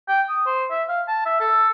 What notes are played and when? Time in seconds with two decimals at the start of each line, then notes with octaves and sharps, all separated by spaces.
0.08 G5
0.29 D#6
0.46 C5
0.71 E5
0.89 F5
1.08 A5
1.26 E5
1.40 A4